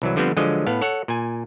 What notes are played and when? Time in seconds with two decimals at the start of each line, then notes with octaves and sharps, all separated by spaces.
0.02 C2 E3 F#3
0.16 D3 F3 G3 B3 C4
0.37 D3 F3 F#3 G#3 D#5
0.67 A2 B3 F5
0.81 A4 C#5 F#5
1.08 A#2 G#5